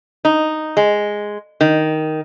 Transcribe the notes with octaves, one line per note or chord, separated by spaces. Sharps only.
D#4
G#3
D#3